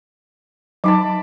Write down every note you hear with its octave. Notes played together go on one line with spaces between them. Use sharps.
F#3 D#4 A5 B5 D6